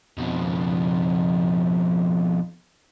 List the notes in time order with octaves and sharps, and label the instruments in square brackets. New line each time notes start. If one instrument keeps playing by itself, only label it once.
[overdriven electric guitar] F2 B2